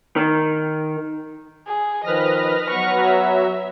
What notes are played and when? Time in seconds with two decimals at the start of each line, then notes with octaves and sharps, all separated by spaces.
0.16 D#3
1.67 G#4
2.04 D#3 F3 B4 D#5 F6 A#6
2.70 F#3 B3 C#6
3.06 E5